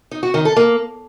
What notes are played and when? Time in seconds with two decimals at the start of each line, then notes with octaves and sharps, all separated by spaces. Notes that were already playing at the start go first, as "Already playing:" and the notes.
0.11 D#4
0.23 F#4
0.34 D#3
0.45 A4
0.56 A#3